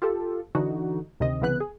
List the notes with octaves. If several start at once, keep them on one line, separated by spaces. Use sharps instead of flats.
F4 G4 A4
D3 E3 D#4 F#4
D2 C3 D#3 D#5
C2 C#3 E3 B3 B4 F#6
G#4